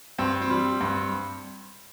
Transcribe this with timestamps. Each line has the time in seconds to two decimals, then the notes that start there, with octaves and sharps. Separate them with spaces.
0.18 G2 C4
0.42 C4
0.50 G3
0.81 G2